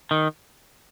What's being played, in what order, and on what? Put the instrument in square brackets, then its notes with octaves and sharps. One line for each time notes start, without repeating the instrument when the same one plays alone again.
[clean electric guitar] D#3